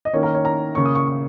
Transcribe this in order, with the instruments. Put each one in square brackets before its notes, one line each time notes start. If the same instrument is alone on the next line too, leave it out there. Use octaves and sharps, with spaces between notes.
[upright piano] D#5
D#3 A#3 C#4 C#5
A#4
C#5
A#5
C#3 A#3 C#4 C#6
D#6
C#6
C#6